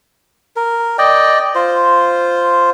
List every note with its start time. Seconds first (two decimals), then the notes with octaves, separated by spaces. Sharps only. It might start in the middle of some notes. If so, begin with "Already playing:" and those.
0.56 A#4
0.98 D5 D#5 G5
1.55 F4 C5